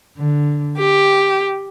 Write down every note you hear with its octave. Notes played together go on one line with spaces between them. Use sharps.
D3
G4